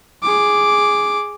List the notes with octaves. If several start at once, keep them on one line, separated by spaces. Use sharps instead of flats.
G#4 D6